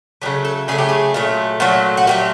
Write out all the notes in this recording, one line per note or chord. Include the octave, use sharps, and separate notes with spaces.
C#3 F#3 A3 G4
A4
C#3 F#3 A3 G#4
G4
G#4
A#2 F#3 A3
A#2 F#3 A3 F#4
F#4
A#2 F#3 A3 G4